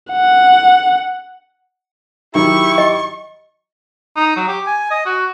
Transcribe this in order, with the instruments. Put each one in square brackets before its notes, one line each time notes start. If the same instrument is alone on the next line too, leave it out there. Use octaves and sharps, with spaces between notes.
[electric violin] F#5
[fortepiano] D#3 F#3 [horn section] E4 G4 [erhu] C#6
[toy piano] D#5
[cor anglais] D#4
F#3
G4
G#5
D#5
F#4